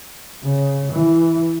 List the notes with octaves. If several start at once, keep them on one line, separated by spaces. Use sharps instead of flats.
C#3
E3